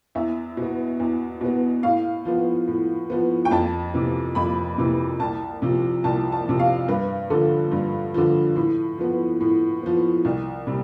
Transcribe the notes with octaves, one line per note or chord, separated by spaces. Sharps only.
E2 E5
B2 B3
E2
B2 B3
A2 F5
F3 B3
A2
F3 B3
G5
F2 A5
C3 E3
F2 B5
C3 E3
C2 A5
C3 F3
C2 A5
A5
C3 F3
F5
G2 B4
D3 F3 A4
G2
D3 F3
A2
F3 B3
A2
F3 B3
C2
C3 G3